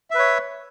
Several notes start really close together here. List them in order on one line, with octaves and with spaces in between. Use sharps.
E5 B4 C#5